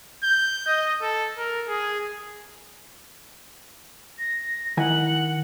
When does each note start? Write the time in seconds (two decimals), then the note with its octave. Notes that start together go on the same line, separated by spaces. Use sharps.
0.23 G6
0.67 D#5
1.02 A4
1.38 A#4
1.68 G#4
4.18 A#6
4.77 D#3 E4 F#5 G#5